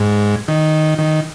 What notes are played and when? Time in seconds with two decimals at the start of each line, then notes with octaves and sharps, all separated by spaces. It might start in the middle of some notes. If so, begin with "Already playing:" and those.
Already playing: G#2
0.48 D#3
0.98 D#3